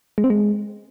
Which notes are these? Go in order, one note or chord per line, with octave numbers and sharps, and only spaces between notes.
G#3
C4
G#3